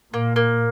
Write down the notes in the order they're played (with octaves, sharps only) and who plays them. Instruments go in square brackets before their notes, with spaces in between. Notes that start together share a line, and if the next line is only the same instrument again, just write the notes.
[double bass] A#2 [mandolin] A#3
[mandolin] A#3